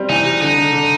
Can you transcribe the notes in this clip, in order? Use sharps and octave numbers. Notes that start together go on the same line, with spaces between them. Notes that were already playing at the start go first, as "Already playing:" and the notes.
Already playing: G3 C4
E3 D#4
G3
D3 D#4
D3
D3